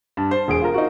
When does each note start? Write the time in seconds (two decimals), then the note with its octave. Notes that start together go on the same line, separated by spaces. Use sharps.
0.17 G2 A5
0.31 C5
0.48 E1 G#4 D7
0.62 F4 A#4
0.74 D#4 F#4